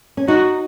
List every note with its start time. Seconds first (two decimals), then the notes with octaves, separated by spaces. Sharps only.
0.17 C#4
0.28 D#4 F#4